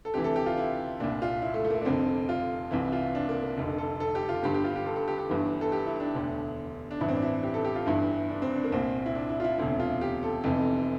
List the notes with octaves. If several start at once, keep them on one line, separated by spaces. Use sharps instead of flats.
A4
D2 C3 E3 G4
A4
G4
F4
E4
C2 A#2 D4
F4
E4
A3
A3
A#3
A3
D4
F1 F2 D3 C4
F4
C2 C3 E3 E4
F4
D4
A#3
A#3
F1 F2 D3
A4
A4
G4
F4
G1 G2 D3 G4
G4
F4
G4
A4
A4
G4
G4
G1 G2 E3
A4
G4
E4
D4
E1 D2 D3
D4
A1 G2 E3 E4
C4
D4
E4
G4
A4
G4
F4
G1 G2 E3 E4
D4
C4
D4
A#3
C2 A#2 C4
E4
D4
E4
F4
E4
E1 D2 C3 E4
F4
G4
A4
F1 F2 C3 E3